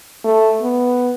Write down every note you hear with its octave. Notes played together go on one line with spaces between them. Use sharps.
A3
B3